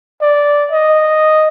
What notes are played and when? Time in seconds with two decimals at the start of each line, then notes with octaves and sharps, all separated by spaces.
0.21 D5
0.72 D#5